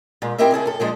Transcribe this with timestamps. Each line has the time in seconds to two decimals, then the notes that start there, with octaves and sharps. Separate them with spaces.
0.22 A#2 G#3
0.38 C4 E4 G4 A#4 D#5 E5
0.51 C#3 E4 G#4 A4
0.66 F#2 A4
0.80 A#2 F3 G#3 D4